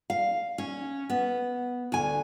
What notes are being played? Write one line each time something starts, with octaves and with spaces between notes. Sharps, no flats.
F5
C#4
B3
D2 G#5